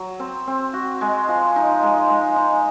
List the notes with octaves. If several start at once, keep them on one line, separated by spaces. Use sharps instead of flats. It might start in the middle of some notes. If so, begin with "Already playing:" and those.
Already playing: F#3
C4
C4
F#4
G#3
F3
D#4
G#3
G#3
D#4